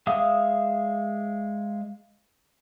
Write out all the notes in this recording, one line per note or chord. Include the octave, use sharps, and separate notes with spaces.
G#3 E5 F5 D#6